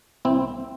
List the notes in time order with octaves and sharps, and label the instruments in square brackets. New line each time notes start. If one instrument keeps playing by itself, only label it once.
[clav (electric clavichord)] C2 C4 E4